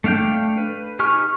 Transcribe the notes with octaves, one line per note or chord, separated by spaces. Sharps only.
A3 D4 F5 G5 G6
B4
D#4 G4 G#5 C#6 F6